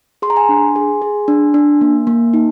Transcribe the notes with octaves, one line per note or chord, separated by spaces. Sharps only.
G#4 C6
A#5
G#5 C6
D4
G#4
G#4
D4
D4
A#3
A#3
D#4